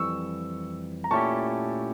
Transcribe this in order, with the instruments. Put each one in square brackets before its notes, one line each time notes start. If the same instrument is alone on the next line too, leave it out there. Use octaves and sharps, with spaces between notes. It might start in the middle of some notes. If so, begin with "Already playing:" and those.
Already playing: [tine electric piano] F2 E3 G3 [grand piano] C#6 E6
[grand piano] A#5
[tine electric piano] A#2 A3 C#4 E4 G4 [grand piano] A5 C#6